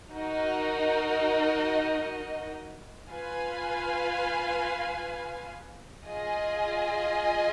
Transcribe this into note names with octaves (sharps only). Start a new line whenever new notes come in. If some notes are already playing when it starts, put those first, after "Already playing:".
D#4 F#4 A#4 D#5
F4 B4 F5 G#5
F4 G#4 D#5 G#5